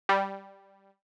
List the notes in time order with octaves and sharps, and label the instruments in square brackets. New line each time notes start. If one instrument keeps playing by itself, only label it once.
[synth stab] G3